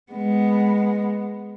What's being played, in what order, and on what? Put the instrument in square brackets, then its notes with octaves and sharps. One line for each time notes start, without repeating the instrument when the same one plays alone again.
[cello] G#3 B3